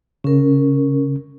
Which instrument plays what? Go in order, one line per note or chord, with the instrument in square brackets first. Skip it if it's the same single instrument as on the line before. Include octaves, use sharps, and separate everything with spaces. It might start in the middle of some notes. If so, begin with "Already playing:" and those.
[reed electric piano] C#3 [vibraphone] C#4 A#4